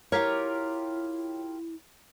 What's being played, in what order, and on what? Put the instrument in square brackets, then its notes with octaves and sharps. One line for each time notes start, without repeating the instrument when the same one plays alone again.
[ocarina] E4 [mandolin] F4 G4 A#4 [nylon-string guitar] C#5